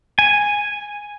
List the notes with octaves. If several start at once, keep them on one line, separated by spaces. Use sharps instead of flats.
G#5